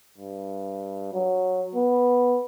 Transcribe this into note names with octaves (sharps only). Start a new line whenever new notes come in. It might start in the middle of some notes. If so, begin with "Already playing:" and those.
G2
F#3
B3